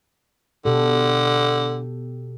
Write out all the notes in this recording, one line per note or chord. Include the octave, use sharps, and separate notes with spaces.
B2 D3 G4 A4